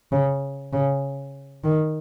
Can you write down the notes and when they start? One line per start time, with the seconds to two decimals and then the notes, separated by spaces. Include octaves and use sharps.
0.12 C#3
0.73 C#3
1.64 D#3